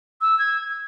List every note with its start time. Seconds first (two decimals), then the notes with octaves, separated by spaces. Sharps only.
0.21 E6
0.39 G#6